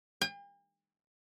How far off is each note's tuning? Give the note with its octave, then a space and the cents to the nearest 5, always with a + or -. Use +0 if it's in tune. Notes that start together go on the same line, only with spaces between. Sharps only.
G5 +45